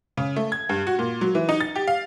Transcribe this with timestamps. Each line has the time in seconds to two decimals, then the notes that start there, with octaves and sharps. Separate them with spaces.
0.17 C#3
0.36 A3
0.52 G#6
0.69 G2
0.87 F#4
0.99 A#2
1.21 F#3
1.35 E3
1.49 D#4
1.60 A6
1.76 G4
1.88 F5